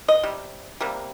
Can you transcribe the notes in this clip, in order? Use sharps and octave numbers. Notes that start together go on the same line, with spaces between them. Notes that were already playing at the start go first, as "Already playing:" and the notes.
D#5
C3 G3
C3 G3 A#3